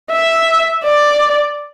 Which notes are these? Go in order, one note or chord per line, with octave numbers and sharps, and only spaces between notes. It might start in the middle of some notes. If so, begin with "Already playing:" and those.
E5
D5